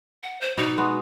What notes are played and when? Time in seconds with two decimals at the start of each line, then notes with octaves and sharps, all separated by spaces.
0.23 F#5
0.41 C5
0.57 B2 D#4 D5 D#5
0.78 G#3 B3 F#4